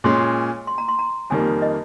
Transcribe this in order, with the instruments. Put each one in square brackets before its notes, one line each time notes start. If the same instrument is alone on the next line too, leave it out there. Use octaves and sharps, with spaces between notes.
[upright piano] A#2 G#3 C#4 G#4 [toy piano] C6
[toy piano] C6
A#5
C6
A#5
[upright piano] F2 D#3 G3 A#3 [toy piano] G#5
[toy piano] D#5